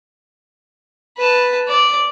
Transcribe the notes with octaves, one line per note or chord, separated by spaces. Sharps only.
B4 A5
D5